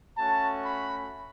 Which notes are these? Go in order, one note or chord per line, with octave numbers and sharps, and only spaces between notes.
A3 C#4 F#4 A5
B5